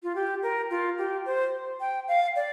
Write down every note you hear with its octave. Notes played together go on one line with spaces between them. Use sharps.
F4
G4
A#4
F4
G4
C5
G5
F5
D5